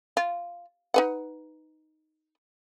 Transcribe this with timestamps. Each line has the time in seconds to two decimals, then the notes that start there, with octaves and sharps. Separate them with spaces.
0.17 F4
0.94 D#4 B4 F#5